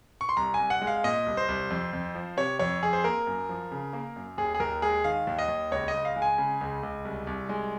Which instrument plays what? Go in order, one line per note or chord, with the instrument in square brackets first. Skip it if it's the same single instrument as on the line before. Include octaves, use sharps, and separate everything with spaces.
[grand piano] C#6
C6
C2 A#5
G#5
C2
F#5
G#3
F5
A#2 D#5
C2
C5
C2
F2
F2
F3
C3 C#5
F2 C#5
F2 G#4
C5
A#3 A#4
F#2
F3
C#3
A#3
F#2
D#2 G#4
G#4
D#2 A#4
G#3 G#4
D#3 F5
D#2
D#5
D#2
C#2 C#5
D#5
C#2
F5
G#3
G#5
C#3
C#2
C#2
C2
C2
G#3